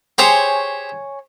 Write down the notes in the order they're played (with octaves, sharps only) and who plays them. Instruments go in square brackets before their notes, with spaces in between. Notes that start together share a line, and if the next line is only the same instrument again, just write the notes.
[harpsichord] G4 G#4 C5 [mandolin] C#5 G#5 C6